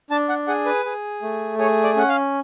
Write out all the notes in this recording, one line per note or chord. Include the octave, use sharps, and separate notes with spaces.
D4 A5
F#5
G#4 F#5
B4
G#4
A3
G#4 C#5
D5
C#4 F#5
F5